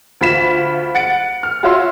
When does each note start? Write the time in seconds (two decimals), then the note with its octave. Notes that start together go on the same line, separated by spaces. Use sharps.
0.21 D2 F4 B5 B6 E7
0.95 F#5 A6 C#7 D7
1.43 F6
1.63 F4 F#4 C#5 E5 F5 C6